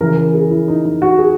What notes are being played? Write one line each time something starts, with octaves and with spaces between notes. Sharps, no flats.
C#3 E3 A#4
A#4
G#4
E4
D#4
D#4
F#4
G#4